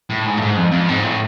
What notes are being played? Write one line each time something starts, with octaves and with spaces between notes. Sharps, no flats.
A2
G#2
A2
G#2
F2
F2
G#2
A2